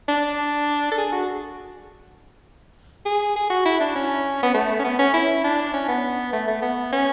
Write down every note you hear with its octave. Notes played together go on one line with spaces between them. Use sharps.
D4
A4
G#4
F#4
G#4
G#4
F#4
E4
D4
C#4
B3
A3
C#4
B3
C#4
E4
D4
C#4
B3
A3
A3
B3
C#4